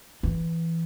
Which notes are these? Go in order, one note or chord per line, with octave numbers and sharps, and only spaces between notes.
E3